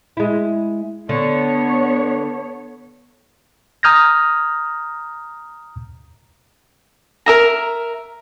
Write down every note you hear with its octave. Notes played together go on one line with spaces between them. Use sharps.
G#3 E4
D3 B3 C#5
A#5 D#6 F6 G6 G#6 A#6
A#4 E5 A#5